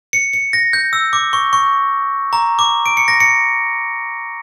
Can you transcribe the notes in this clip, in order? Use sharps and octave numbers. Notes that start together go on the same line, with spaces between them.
C#7
C#7
A#6
G6
E6
D6
C#6
C#6
A#5
D6
D7
C#7
A#6
C#7